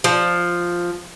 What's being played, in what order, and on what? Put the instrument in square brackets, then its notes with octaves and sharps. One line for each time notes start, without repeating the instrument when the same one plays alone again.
[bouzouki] F3